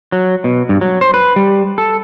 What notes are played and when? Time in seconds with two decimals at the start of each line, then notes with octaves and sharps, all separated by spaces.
0.12 F#3
0.44 B2
0.69 G2
0.81 F#3
1.01 C5
1.14 B4
1.36 G3
1.78 A4